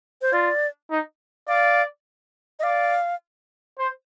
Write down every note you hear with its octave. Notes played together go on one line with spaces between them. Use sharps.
C5
F4 D5
D#4
D5 F5
D#5
D5 F5
C5